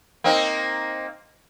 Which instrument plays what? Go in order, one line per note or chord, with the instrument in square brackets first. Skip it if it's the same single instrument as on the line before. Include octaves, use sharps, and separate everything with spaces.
[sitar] A#3 C4 D#4